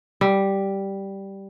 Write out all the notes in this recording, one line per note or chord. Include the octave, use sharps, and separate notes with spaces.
G3